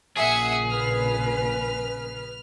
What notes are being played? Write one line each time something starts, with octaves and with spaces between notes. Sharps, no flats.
A#1 A#2 C#3 G#4 E5 F#5 G#5
B4 F6